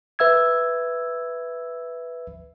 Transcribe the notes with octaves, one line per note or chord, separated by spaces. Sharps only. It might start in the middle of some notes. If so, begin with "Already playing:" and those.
B4 E5 E6 G#6